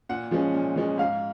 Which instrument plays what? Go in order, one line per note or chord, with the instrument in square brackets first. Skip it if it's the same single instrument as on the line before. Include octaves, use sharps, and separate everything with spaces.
[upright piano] A#2 F#5
F3 G#3 C#4
A#2
F3 G#3 C#4
G#2 F5